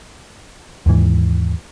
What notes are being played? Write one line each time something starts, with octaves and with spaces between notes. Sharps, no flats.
D#2 G#2 E3